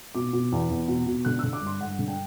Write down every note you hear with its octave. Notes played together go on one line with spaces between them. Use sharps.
B2 D6
B2
E2
E2
B2
B2
D3 F#6
D3 E6
D6
G2
C6
G2 F#5
D3
G5